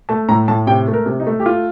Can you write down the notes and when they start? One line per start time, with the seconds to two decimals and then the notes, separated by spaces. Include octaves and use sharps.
0.09 A3 A5
0.29 A2 A#5
0.48 A2 A5
0.67 C3 G5
0.88 A3
0.93 A#4
1.06 C3
1.20 D#4
1.27 A3
1.40 G4
1.45 A3 F4